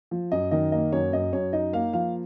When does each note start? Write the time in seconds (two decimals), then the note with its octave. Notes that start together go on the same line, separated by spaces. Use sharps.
0.11 F3
0.32 F#2 D#5
0.51 D#3 D#5
0.72 A#3 D#5
0.92 F#2 C#5
1.13 F#2 D#5
1.33 F#2 C#5
1.53 D#4 D#5
1.73 A#3 F5
1.93 F3 F5